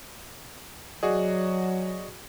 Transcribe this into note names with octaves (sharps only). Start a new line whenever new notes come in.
F#3 F#4 G#4 D5 D#5